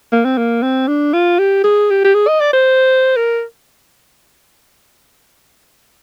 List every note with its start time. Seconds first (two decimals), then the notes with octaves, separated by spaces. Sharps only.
0.12 A#3
0.25 C4
0.38 A#3
0.63 C4
0.88 D4
1.13 F4
1.39 G4
1.64 G#4
1.90 G4
2.04 G4
2.14 G#4
2.28 D#5
2.41 D5
2.53 C5
3.16 A#4